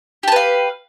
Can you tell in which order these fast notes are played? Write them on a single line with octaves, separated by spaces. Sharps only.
G4 A5 B4 F5